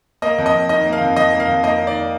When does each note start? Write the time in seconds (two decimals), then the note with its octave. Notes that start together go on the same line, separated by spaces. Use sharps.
0.22 A#3 D#5
0.38 F2
0.46 D#5
0.54 F2
0.69 D#3 D#5
0.85 A#3
0.93 F5
1.01 F2
1.16 F2 D#5
1.32 A#3
1.40 F5
1.48 F2
1.63 A#3 D#5
1.79 D#3
1.87 D5